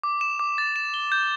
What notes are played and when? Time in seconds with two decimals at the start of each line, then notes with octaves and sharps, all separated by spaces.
0.03 D6
0.21 E7
0.40 D6
0.58 A6
0.76 E7
0.94 G7
1.12 G6